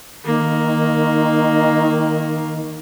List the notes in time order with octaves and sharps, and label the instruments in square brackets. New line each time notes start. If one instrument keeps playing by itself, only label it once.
[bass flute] D#3 [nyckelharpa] A#3